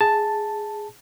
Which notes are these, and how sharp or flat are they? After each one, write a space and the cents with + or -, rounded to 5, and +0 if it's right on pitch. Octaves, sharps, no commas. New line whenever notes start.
G#4 +0 A5 +0